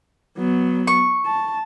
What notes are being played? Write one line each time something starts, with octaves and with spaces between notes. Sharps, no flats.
F#3 B3
C#6
A5